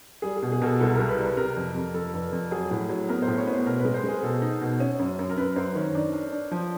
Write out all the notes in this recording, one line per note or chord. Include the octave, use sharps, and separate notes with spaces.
G3 G#4
G#4
B2
G#4
B2 A4 A#4
C2 A4
C2 A#4
B4
G3
B4
C3 A#4
F2
F2
F2 A4
F1
F2
F#3 G#4
A2
F#3
B3 A#4
C5
A2
C#5
B3
C5
B2 A#4
B4
G#3
C5
G#3 G#4
B2 A4
D#4
B2
C#4
F#2
F#2
A#4
F#2 B4
F#2 C5
D#3 C#5
D4
D4
D4
F3